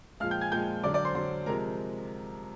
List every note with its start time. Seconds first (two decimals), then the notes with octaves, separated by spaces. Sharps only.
0.20 A#2 F3 G#3 F5 F6
0.31 G5 G6
0.41 G#5 G#6
0.51 A#2 F3 G#3 G5 G6
0.84 D3 F#3 D5 D6
0.94 D5 D6
1.05 C5 C6
1.15 D3 F#3 C5 C6
1.46 C3 F3 G#3 A#4 A#5